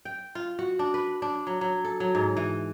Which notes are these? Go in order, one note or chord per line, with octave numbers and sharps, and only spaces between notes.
G5
F4
F#4
D4
B4
D4
F#3
F#3
A4
F#3
G#2
E3